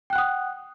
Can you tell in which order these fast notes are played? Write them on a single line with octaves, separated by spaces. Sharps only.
G5 F#6 F#5 D#6